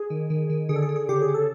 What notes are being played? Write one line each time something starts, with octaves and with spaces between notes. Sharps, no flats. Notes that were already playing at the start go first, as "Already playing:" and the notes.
Already playing: G#4
D#3
D#3
D#3
D3 G#4
A4
G#4
D3
G#4
C#3 G4
G#4
C#3
A4